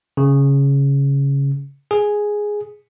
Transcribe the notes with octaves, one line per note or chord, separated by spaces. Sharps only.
C#3
G#4